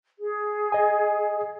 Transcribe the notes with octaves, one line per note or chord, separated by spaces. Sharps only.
G#4
D#5 G#5